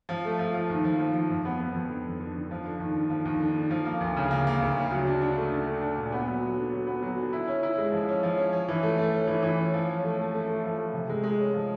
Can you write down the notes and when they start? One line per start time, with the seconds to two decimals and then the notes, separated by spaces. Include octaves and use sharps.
0.09 F3
0.25 A3
0.39 F3
0.54 F3
0.70 D#2
0.84 F3
1.00 F3
1.14 F3
1.30 F2
1.45 B3
1.60 B3
1.74 F2
1.90 D3
2.05 F2
2.20 D3
2.35 D3
2.51 F3
2.65 D3
2.80 D#2
2.96 D3
3.10 F3
3.25 D#2
3.40 D3
3.56 D3
3.71 F3
3.85 A#3
4.00 D2
4.17 C#3
4.31 A#3
4.47 A#3
4.61 D2
4.77 C#3
4.91 F#3
5.07 D4
5.22 D4
5.36 A3
5.52 D4
5.66 A3
5.81 D4
5.97 A#2
6.12 B3
6.27 F#3
6.42 F#3
6.57 D3
6.72 F#3
6.87 B3
7.03 F#3
7.17 D3
7.33 E4
7.47 C#4
7.63 E4
7.78 G#3
7.92 F3
8.08 C#4
8.23 F3
8.37 C#4
8.53 C#4
8.68 E3
8.83 A3
8.98 A3
9.13 C#4
9.28 E3
9.43 E3
9.59 C#4
9.74 F3
9.89 C#4
10.04 A3
10.19 A3
10.34 A3
10.48 A3
10.64 F3
10.78 A3
10.93 C3
11.09 G#3
11.23 G#3
11.39 C#4
11.54 F3